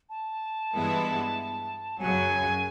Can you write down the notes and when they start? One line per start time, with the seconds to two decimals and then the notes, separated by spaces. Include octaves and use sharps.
0.10 A5
0.73 G2 E3 G#3 B3 E4
1.99 F#2 C#3 F#3 G#5